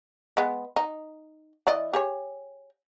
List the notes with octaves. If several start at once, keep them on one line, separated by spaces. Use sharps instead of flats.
G#3 B3
D#4
E3 D5 D#5
G4 G#4 C#5